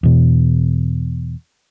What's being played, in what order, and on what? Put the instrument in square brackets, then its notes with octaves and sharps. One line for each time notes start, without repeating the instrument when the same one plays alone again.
[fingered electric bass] E2 B2